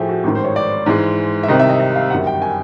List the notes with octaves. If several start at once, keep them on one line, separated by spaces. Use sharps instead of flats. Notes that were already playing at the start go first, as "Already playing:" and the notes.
Already playing: A2 F3 A3 G4 G#4
F#4
A1 G#2 D#3 F#4
C5
C#5
D5
G#2 E3 G#3
E5
C2 C3 D#3 D#5
E5
D#5
D#5
F5
G1 F#2 D#3 G3 F#5
G5
G#5